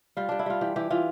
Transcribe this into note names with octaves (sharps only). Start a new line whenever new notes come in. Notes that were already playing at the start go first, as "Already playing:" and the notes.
G3 F4
G3 D4
E4
G3 F4
E3 G4
E3 G4
E3 F4